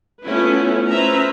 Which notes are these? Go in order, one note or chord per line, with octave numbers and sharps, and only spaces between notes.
A3 B3 C#4 E4 F4 B4
C#4 B4 C5 E5 A#5